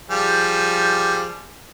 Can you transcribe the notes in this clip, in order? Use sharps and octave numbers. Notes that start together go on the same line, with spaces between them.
F3 G3 G#4